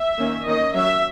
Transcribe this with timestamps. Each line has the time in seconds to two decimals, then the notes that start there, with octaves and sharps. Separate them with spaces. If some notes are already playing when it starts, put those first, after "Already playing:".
Already playing: E5
0.18 D#3 A#3 C#4
0.47 D#3 A#3 C#4 D#5
0.75 F#3 C#4 E5